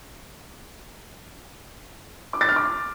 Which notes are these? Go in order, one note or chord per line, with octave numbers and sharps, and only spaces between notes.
D6
A6
F6
D6